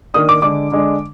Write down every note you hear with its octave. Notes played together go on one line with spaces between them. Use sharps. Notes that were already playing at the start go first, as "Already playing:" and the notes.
D#3 A#3 D4 D#6
D6
D3 G#3 D4 D6
D3 G#3 D4